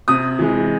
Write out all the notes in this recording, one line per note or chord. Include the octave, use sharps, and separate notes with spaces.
C3 D#6
E3 G#3